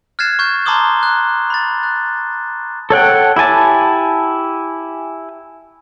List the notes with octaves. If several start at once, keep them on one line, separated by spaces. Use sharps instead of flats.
F6 F#6 G#6 A6 C7 E7
C#6 G6
A5 A#5 C6 D6 D#6 G7
F#6
B5 A6
F#6
A4 C#5 F#5 G5
E4 G4 G#5 A5